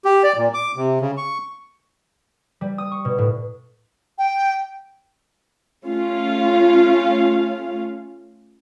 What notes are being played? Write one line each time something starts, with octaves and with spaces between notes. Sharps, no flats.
G4
D5
A#2
D6
C3
C#3
C#6
G3
D#6
C#6
B2
A2
G5
A3 C#4 F4 F5